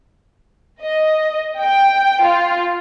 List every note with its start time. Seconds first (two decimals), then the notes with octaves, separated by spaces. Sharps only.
0.83 D#5
1.59 G5
2.21 F4